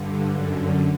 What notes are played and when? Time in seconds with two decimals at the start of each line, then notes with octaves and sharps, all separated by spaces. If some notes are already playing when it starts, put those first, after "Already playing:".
Already playing: G2 D3
0.31 F#2 D3